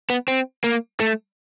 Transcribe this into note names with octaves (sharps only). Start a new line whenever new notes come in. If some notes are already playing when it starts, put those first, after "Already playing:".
B3
C4
A#3
A3